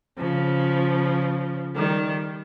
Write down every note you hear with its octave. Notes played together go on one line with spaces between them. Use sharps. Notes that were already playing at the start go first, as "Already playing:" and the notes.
C#3 F3
D#3 G3